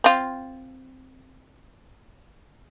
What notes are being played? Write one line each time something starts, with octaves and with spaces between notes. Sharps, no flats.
C4 F4